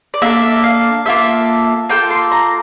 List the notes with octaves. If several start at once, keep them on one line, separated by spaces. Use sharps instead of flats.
D5
A#3 D4 A4 E5
F5
A#3 F4 A4 E5
A#3 F4 A4 G5
C6
A#5